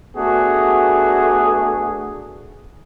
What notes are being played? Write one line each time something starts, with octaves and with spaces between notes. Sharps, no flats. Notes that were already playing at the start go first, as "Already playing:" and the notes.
A3 B3 D4 F#4 G#4